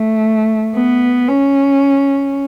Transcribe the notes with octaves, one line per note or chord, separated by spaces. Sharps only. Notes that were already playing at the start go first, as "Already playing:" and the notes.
Already playing: A3
B3
C#4